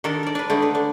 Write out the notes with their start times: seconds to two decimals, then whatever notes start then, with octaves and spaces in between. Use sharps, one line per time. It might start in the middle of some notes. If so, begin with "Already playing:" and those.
0.04 D#3 D4 A4 A#4
0.23 A#4 D5
0.35 D4 B4
0.50 D3 A3 D#4 D5
0.62 B4
0.75 D4